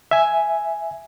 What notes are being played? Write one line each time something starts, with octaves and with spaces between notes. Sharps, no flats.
E5 G#5